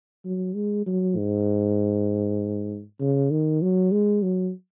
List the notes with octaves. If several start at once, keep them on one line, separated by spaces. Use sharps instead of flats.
F#3
G#3
F#3
G#2
C#3
D#3
F#3
G#3
F#3